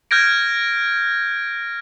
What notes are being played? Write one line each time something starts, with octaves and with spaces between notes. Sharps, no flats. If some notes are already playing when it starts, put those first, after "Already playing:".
F6 G6 G#6 A#6 D7